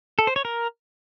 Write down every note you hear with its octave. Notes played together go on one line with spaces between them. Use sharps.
A4
C5
C#5
A#4